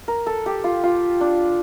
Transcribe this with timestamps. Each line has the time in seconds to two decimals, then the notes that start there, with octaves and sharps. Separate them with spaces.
0.08 A#4
0.26 A4
0.46 G4
0.64 F4
0.83 F4
1.21 D4